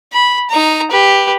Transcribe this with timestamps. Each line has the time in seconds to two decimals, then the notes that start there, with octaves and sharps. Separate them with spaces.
0.12 B5
0.49 D#4 A#5
0.91 G4 B4